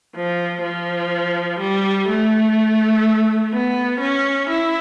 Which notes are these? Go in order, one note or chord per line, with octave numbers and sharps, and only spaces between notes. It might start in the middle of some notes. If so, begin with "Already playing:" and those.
F3
F3
G3
A3
B3
C#4
E4